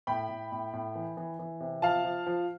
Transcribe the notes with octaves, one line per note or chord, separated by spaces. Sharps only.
A2 G5 B5
A2
A2
A2
E3
E3
E3
C3
F3 F5 A5
F3
F3